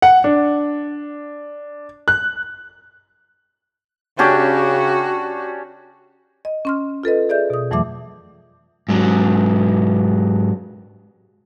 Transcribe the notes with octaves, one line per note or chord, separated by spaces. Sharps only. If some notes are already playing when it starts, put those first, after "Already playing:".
F#5
D4
F#6
C#3 C#4 D4 F#4 G4
D#5
C#4 C6 F6
F4 A4 B4 D#5
G#4 D5 E5 G6
B2 D#6
F2 E3 F#3 A3 E5 D6
G#2 F#3